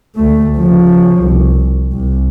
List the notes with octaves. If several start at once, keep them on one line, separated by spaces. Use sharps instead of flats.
D2 A3
C#3 F3
C2
C2